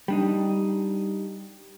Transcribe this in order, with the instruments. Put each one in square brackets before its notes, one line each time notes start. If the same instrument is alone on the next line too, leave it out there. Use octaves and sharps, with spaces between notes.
[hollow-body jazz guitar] G3 D4 D#4